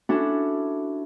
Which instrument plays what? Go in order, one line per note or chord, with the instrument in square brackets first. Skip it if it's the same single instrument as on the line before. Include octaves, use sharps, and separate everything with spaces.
[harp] C#4 D4 E4 F#4 A4